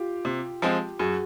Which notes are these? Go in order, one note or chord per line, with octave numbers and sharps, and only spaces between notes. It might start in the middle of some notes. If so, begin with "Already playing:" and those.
Already playing: F4 G4
C3
F3 G#3 C4
F#2 F#4 G#4